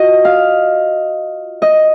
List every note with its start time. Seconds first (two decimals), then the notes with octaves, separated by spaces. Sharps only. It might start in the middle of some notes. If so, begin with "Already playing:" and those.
Already playing: F4 F#4 D#5
0.25 F5
1.62 D#5